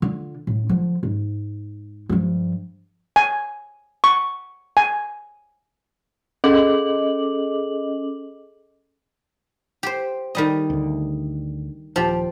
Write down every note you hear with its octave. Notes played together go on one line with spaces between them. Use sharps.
D3 F4
A2
D3 F3
G#2
G2 F3
G#5
C#6
G#5
C#4 G#4 A4 D#5 D6 F#7
G4 C5
D#3 G3 D#5
D2 D3
D#1 F3 G4